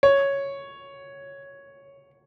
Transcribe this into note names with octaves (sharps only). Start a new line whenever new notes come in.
C#5